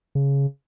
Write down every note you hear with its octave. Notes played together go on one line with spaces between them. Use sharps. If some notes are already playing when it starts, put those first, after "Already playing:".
C#3